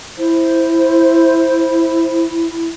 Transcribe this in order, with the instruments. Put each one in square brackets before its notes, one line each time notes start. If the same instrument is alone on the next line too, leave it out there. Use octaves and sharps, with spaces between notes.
[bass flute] E4 [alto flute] C5